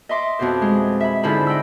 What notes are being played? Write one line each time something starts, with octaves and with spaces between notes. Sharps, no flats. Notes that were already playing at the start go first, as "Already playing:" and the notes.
D#5 E5 C6 D6 D#6
F2 B2 C5
G#3
E5 B5
G#2 D3 E4 F4 C5 B5
D#5 G5 B5 E6